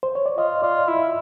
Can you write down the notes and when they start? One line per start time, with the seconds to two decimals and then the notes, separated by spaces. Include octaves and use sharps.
0.03 C5
0.15 C#5
0.26 D5
0.38 F4 D#5
0.63 F4 D5
0.88 E4 E5